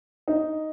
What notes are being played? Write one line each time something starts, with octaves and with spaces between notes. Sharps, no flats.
D#4